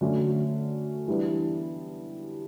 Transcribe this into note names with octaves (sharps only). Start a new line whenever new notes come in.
D3 F#3 A3 C#4
E3 G3 B3 D4